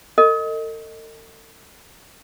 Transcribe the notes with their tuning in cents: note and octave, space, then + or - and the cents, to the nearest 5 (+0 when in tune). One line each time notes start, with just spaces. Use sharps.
A4 +45 D#5 +0